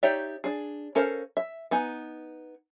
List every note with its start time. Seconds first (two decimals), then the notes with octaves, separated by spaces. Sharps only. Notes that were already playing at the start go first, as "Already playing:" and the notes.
0.03 D#4 G4 C#5 D5 E5
0.44 D4 G#4
0.95 C#4 A4 A#4 C5 F5
1.37 E5
1.71 B3 D#4 G#5